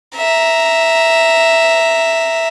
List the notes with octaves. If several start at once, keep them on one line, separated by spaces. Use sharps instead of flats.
E5 A#5